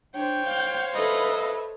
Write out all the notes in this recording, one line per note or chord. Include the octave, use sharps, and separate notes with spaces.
D4 C5 C#5 G5
F5 G6
A4 B4 D#5 E5